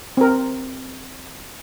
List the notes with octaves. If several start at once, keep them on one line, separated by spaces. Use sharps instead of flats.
C4 A#4